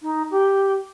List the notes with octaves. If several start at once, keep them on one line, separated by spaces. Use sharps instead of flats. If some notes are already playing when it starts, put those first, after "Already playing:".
D#4
G4